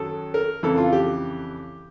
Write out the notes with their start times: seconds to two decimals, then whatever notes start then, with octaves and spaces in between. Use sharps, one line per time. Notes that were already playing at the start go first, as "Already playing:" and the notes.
Already playing: F#2 D#3 F#3 A4
0.34 A#4
0.63 F2 C#3 E3 A4
0.78 F4
0.92 G4